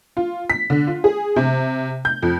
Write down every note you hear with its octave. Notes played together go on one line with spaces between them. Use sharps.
F4
B6
D3
F4
G#4
C3
G6
F2